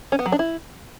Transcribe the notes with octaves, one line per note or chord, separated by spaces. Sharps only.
C#4
B3
F#3
D4
E4